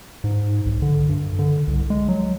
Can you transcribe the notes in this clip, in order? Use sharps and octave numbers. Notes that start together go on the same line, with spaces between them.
G#2
B1
D3
G2
D3
C2
G#3
F#3